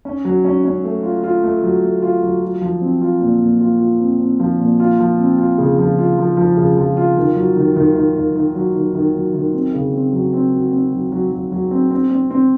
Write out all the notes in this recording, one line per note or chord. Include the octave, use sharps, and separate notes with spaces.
C#4
F#3
C#4
C#4
A3
F4
F4
A3
F#3
A3
F4
F#3
F4
F3
C4
F4
A#2
A#2
F4
F4
C4
C4
F3
A#2
F4
F3
C4
F4
C#3
F3
F4
F3
F3
C#3
F3
F4
D#3
F#3
D#3
D#3
D#3
D#3
D#3
F#3
D#3
D#3
F#3
D#3
C4
C#3
C4
F#3
C4
F#4
C4
F#3
F#3
F#3
F#3
C4
C4
C4
C4